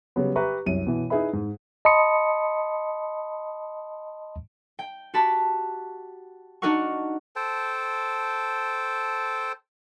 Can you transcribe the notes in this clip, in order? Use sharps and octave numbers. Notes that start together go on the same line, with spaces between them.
C#3 F#3 G3 B3
G4 B4 E5 A#5 C#6
C2 F#2 D#7
B2 E3
D#4 E4 G#4 B4 E5 B5
G#2
D#5 A5 B5 C6 D#6 C#7
G5
F#4 G4 A5 B5
D4 D#4 F#4 A#4 F#5 C#6
A4 C5 G5 A5